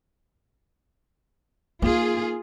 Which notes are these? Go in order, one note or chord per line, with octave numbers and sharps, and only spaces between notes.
A#3 D#4 F4 G#4